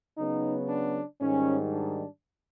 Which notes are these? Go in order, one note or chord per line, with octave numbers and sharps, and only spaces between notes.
C#3 F#3 B3 D#4
D4
G#2 D#3 G3 C#4
D4